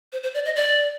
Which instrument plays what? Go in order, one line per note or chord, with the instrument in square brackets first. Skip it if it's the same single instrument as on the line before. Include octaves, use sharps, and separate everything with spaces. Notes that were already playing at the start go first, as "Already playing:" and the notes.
[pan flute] C5
C5
D5
D#5
D5